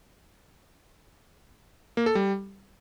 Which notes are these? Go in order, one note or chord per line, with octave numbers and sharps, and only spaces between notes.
A#3
A4
G3